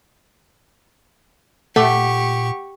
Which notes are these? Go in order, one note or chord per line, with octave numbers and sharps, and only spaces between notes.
A#2 A3 G4 F#5 C#6 D6